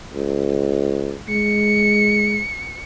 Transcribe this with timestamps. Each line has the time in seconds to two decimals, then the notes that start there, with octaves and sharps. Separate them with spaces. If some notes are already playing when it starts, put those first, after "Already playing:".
0.14 C#2
1.29 G#3 C#7